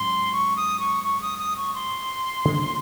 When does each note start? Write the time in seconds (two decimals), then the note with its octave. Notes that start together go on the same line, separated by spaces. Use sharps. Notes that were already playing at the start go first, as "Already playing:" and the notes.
Already playing: G#2 F#3 C#4 C6
0.32 C#6
0.56 D#6
0.80 C#6
1.04 C#6
1.21 D#6
1.38 D#6
1.57 C#6
1.74 C6
2.45 C#3 F3 A#3 C#4